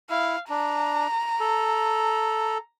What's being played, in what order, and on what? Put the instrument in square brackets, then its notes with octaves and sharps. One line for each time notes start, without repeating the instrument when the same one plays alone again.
[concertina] E4 [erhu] F5
[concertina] D4 [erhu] A#5
[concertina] A4